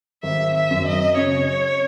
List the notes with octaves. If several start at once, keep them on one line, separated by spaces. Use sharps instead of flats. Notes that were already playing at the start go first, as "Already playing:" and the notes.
G#1 E5
E5
F#2
D#5
C#3 C#5